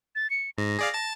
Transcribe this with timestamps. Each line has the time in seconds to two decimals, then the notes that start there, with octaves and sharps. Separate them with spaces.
0.15 A6
0.30 C#7
0.58 G#2 A#6
0.79 G#4 D5 F5
0.94 A5 A6